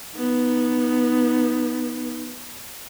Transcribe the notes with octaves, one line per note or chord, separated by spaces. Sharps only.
B3 D#4